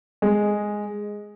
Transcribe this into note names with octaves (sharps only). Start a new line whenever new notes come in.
G#3